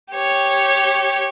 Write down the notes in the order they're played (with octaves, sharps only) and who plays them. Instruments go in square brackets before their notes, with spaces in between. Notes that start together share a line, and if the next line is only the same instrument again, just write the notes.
[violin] G4 C#5